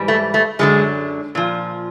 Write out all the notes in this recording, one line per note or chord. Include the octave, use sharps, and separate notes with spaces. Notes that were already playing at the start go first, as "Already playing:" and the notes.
Already playing: G#2 E3 G3
A3
A3
F#2 D3 F#3 G#3
A#2 F3